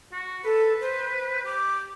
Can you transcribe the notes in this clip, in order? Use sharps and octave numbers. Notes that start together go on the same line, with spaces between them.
F#4
A4 B4
C5
C5
G4 D6